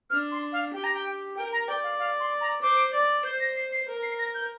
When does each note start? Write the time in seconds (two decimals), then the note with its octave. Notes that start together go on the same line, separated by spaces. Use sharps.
0.10 D4 F6
0.32 C6
0.52 F5
0.74 G4 G5
0.84 A#5
0.94 G5
1.36 A#4 G5
1.52 A#5
1.68 D5 G5
1.83 F5
1.99 F5
2.20 C6
2.41 A#5
2.62 C5 D6
2.93 D5
3.25 C5 G6
3.40 A#6
3.56 C7
3.72 C7
3.88 A#4
4.03 C7
4.19 A#6
4.35 G6